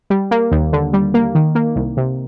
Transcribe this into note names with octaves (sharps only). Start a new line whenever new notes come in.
G3
A#3
D#2
D3
G3
A#3
D#3
A#3
C2
C3